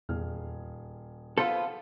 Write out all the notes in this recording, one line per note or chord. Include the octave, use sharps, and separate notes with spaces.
D#1 E2 G#4 F6
B3 F4 A4 C5